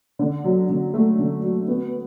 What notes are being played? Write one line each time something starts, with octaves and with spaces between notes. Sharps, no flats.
D3
F#3
D3
A3
D3
F#3
B3